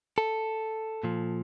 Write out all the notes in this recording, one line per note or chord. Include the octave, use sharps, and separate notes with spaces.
A4
A#2 F3